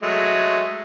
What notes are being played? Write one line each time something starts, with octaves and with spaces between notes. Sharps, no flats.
F#3 G#3 A3